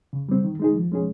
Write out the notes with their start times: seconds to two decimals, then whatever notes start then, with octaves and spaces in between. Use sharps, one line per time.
0.13 C#3
0.29 G3 C4
0.44 D#3
0.60 G#3 D#4 G#4
0.76 F3
0.92 G#3 C#4 G#4